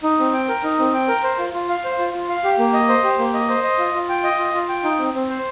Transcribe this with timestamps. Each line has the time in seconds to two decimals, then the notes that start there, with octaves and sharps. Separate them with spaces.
0.03 D#4
0.19 C4
0.33 G5
0.49 A#4
0.63 D#4
0.79 C4
0.94 G5
1.08 A#4
1.24 C5
1.39 F4
1.53 F4
1.69 F5
1.84 C5
1.99 F4
2.14 F4
2.28 F5
2.44 G4
2.59 A#3
2.73 D#5
2.89 C5
3.04 G4
3.19 A#3
3.34 D#5
3.49 C5
3.64 D#5
3.79 F4
3.94 F4
4.09 G5
4.24 D#5
4.39 F4
4.54 F4
4.69 G5
4.84 D#4
4.99 C4
5.14 C4
5.29 C5